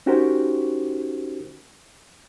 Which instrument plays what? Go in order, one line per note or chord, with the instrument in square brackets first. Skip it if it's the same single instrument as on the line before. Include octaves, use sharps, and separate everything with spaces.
[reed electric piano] C#4 D#4 F#4 G4 A#4 C5